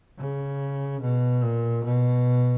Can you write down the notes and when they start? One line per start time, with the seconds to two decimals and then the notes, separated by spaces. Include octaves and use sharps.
0.19 C#3
1.02 B2
1.43 A#2
1.84 B2